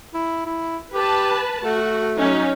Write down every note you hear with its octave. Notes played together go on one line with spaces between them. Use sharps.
E4
E4
G4 B4 A5
A3 F#4
F#3 C#4 D#4